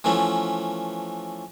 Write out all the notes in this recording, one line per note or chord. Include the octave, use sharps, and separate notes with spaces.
E3 F3 A3 B3 C#4